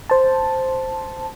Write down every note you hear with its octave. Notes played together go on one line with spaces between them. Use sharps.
C5 A5